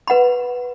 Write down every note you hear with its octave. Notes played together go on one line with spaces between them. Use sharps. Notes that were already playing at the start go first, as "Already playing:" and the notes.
B4 F#5 B5